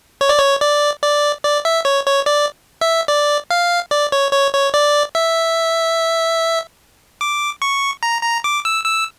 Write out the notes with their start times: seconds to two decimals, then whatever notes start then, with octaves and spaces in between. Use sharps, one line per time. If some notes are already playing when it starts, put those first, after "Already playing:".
0.21 C#5
0.29 D5
0.39 C#5
0.61 D5
1.02 D5
1.44 D5
1.65 E5
1.85 C#5
2.06 C#5
2.26 D5
2.81 E5
3.08 D5
3.50 F5
3.91 D5
4.12 C#5
4.33 C#5
4.54 C#5
4.74 D5
5.15 E5
7.21 D6
7.62 C#6
8.03 A#5
8.23 A#5
8.44 D6
8.65 E6
8.85 E6